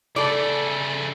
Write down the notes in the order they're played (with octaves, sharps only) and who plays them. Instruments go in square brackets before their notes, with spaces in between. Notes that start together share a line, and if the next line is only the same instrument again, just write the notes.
[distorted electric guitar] C#3 A3 [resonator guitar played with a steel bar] A4 D5